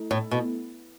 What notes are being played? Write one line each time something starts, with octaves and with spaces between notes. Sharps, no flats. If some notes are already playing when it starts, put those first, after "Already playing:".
Already playing: A3 E4 A4
A2
B2